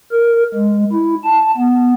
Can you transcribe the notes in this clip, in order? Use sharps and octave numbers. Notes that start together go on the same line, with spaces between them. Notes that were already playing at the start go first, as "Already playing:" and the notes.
A#4
G#3
E4
A5
B3